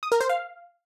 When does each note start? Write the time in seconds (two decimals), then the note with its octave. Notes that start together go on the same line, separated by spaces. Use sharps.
0.03 D#6
0.12 A#4
0.21 C5
0.29 F5